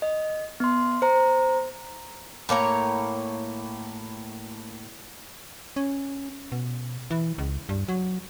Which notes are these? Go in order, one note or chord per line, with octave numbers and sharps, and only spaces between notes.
D#5
B3 C6
C5 A#5
A2 A#3 C#5 A#5
C#4
B2
E3
C#2
G2
F#3